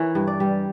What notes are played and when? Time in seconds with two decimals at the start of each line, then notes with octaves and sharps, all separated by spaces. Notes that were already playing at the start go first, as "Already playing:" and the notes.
Already playing: E3 A#4 C#5
0.15 G2
0.27 D5
0.40 G3